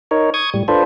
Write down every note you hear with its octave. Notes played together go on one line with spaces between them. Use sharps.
D#4 A#4 C#5
C#6 D#6 G#6
A2 G3
D4 F4 A4 B4 C5